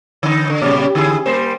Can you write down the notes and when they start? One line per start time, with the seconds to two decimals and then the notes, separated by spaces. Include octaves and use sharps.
0.23 D3 D#4
0.50 D3
0.62 A#2 C#3 G3
0.95 D3 E4 G#4
1.26 G3 A#3 C5